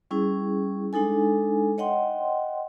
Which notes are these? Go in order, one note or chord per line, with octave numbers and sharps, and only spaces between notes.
G3 C#4 E4 G#4
G#3 D4 D#4 A4 G#5
C#5 D#5 F#5 G5 C6